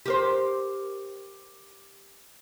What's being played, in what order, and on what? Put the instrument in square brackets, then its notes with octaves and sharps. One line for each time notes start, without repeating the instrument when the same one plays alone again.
[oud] G4 A#4 C5